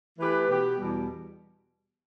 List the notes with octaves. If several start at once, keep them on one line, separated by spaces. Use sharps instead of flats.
E3 A3 G4 B4
B2 B3 G4
E2 B2 G3